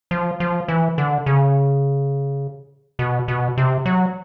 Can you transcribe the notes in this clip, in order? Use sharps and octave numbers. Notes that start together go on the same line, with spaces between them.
F3
F3
E3
D3
C#3
B2
B2
C3
F#3